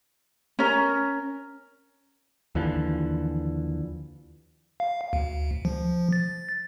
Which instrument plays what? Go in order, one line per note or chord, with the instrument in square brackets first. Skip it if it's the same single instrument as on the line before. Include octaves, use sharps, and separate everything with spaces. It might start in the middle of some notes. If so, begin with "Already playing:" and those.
[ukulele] C#4 A#4
[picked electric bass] D#2 D3 E3 F3
[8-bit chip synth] F5
D2
F3
A6